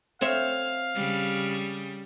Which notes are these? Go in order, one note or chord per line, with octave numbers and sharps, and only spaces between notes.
C4 C#5 E5 F5
C#3 G3